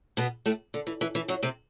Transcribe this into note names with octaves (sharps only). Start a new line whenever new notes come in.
B2 B3
A2 A3
D3
E3
E3
E3
F#2 F#3
C3 C4